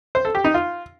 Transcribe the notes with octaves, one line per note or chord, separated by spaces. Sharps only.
C5
A4
G4
D#4
F4